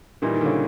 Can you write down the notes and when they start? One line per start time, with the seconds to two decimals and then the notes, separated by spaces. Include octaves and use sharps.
0.22 A#2 E3 G3 A#3 D#4
0.34 D#3
0.41 D3
0.46 C#3